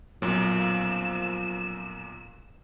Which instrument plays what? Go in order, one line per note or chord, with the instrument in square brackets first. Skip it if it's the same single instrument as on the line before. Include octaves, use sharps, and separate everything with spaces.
[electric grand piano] B1 F#2 A#2 [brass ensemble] F3 F4 [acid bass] F#3 [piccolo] E7